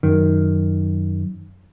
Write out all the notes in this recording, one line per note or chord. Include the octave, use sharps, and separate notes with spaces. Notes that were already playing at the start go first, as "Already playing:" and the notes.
F#2 D#3